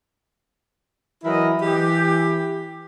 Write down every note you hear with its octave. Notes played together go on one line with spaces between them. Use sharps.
E3 F#3 E4 A#4 D#5
E3 G4